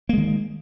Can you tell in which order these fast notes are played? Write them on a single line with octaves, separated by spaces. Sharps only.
A#3 G#3 D#3